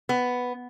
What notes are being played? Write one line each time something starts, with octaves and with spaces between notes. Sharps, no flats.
B3